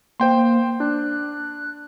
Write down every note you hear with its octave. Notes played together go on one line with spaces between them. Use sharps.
A#3 C5 G5 C6
D4 F#6